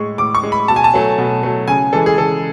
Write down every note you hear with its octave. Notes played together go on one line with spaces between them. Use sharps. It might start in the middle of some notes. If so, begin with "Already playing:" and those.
Already playing: A2 G#3 C#6
A2 D6
C#6
G#3
B5
B2 A5
G#5
A5
F#3 A3
B2
F#3 A3
C#3 G#5
E3 G#3 A4
G#4
C#3 A4